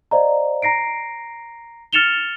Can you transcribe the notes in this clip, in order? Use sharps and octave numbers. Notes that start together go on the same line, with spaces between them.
C5 D5 D#5 F5 A#5
A#5 A#6 C7 D7
F6 A6 C#7 E7 F7 G7